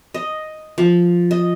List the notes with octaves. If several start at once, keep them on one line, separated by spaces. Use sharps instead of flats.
D#5
F3
D#5